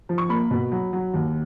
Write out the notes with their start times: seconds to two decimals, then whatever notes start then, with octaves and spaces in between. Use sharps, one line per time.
0.09 F3
0.18 C#6
0.29 A#3 B5
0.51 B2
0.72 F#3
0.93 F#3
1.14 D#2